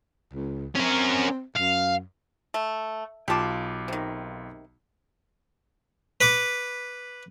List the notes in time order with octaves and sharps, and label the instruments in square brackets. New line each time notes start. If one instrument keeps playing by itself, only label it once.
[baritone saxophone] C#2
[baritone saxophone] C4 [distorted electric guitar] C#4 A#4
[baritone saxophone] F#2 [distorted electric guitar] F5
[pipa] A3
[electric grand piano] B1 F4 D6 [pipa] G4 A5
[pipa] C3 D#3
[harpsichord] B4 B5 D6